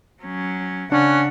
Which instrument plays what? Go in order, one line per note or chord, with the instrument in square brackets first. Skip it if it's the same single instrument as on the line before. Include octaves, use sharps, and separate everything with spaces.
[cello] F#3 C#4
[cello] C#3 F#5 [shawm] C#4 [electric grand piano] D4